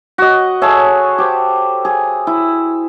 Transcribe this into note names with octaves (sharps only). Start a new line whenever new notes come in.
F#4 D#5
G#4 A4 C#5 E5
G4 C5
G#4
E4